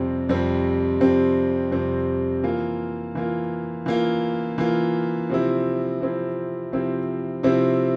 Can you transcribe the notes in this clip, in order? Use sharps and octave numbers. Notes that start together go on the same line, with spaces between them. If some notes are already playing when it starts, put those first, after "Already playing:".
Already playing: F2 C3 G3 C4
F2 C3 G3 C4
F2 C3 G3 C4
F2 C3 G3 C4
E3 A#3 F4
E3 A#3 F4
E3 A#3 F4
E3 A#3 F4
C3 F3 C4 E4
C3 F3 C4 E4
C3 F3 C4 E4
C3 F3 C4 E4